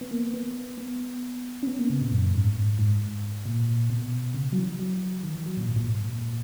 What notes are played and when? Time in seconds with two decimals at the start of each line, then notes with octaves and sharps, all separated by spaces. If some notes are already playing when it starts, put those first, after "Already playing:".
0.01 B3
0.11 A#3
0.34 B3
0.78 B3
1.63 C#4
1.67 B3
1.79 A#3
1.90 C#3
2.01 A#2
2.12 F#2
2.34 G#2
2.56 G#2
2.79 G#2
3.46 A#2
3.90 B2
4.34 C#3
4.53 F#3
4.57 E3
4.79 F#3
5.23 D#3
5.35 E3
5.46 F#3
5.57 A#2
5.69 G#2
5.76 A#2
5.84 G#2
6.13 A#2